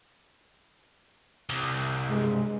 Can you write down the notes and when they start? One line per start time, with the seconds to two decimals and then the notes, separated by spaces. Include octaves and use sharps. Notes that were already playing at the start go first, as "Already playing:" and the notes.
1.50 C2
2.09 G2 G#3